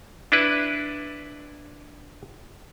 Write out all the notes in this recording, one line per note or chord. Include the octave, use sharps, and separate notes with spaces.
D4 E4 B4